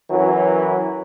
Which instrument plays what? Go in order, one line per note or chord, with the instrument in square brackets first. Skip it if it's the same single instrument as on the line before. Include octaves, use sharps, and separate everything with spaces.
[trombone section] F#2 E3 F#3